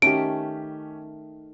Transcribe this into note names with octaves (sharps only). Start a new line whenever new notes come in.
D#3 A3 C#4 G4 D7